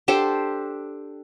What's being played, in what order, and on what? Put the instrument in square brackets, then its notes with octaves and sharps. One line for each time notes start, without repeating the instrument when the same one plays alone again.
[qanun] D4 G4 A4 C5